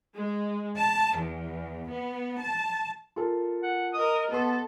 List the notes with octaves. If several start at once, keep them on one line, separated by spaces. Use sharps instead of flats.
G#3
A5
E2
B3
A5
F4 A4 A#4
F#5
A#4 D#5 D#6
B3 A4 B4 C6